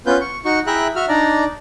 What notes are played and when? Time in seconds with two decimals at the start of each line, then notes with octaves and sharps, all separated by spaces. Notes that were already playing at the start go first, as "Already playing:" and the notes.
0.06 B3 C#4 F4 B4 G6
0.21 C#6
0.45 D#4 F#4 C#6
0.67 E4 G#4 E5 G5 A#5 F#6
0.95 F#4 E5 F6
1.09 D4 D#4 D5 A#5